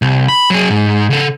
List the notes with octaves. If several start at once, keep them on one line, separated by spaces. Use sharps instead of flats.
C2
B5
F#3 G#4
G#2
C#3 A4